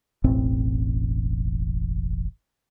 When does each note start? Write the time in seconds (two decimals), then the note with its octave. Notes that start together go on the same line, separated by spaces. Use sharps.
0.24 E1 A1 A2 C4